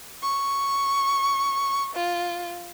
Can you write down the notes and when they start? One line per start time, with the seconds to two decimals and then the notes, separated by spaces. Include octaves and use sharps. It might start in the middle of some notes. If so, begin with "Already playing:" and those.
0.21 C#6
1.94 F4